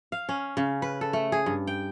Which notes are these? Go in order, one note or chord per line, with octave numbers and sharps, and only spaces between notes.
F5
C#4
C#3
B4
A4
A3
G#4
G2
G5